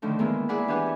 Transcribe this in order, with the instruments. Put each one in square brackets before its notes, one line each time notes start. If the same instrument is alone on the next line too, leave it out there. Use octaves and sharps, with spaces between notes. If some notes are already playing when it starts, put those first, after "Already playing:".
[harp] A2 D3 D#3 F3 A3
G#3 A#3 B3 E4
E4 G#4 D5 F#5 B5
E3 D4 G4 B4 F#5 G#5